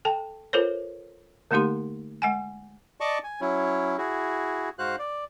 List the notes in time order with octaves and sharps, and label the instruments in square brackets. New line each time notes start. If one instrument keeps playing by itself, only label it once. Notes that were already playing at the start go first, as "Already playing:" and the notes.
[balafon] A4 G5 A5
F4 A4 A#4 C5 C#5
D3 A3 A#3 D#4 G4 C6
G#3 F#5 G#5
[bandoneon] D5 D#5 A5 C#6 D6
G#5
F#3 C#4 E4
E4 F#4 G#4
G#2 F#4 C5 F5 F#6
D5